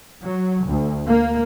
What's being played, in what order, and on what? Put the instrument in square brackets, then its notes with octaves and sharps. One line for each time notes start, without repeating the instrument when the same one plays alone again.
[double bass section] F#3
D2
A#3